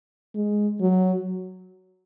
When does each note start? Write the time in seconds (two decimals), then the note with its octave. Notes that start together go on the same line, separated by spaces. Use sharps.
0.35 G#3
0.81 F#3